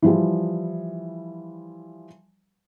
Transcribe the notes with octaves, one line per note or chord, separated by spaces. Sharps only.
E3 F3 G3